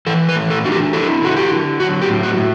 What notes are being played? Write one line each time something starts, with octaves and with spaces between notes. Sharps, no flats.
E3 A4
B4
A3
A4
D4 F#4
G4
E4 A4
D3 F#4
G4
D3
F#3 F#4
G4
A2
F#4
A2